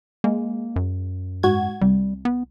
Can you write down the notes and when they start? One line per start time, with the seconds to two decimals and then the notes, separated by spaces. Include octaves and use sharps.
0.24 G#3 A#3
0.76 F#2
1.43 G#2 F#4 G#6
1.81 C2 G3
2.25 B3